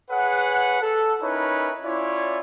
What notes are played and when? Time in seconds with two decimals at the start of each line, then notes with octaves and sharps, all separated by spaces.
0.11 G#4 B4 C#5 F#5
0.82 A4
1.22 C#4 D#4 E4 A#4 B4 C#5
1.85 C#4 E4 F4 C#5 D5